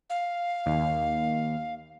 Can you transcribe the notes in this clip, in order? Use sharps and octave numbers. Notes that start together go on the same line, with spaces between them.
F5
D#2